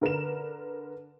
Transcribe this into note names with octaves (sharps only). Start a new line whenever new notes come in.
D3 A#4 B4 E7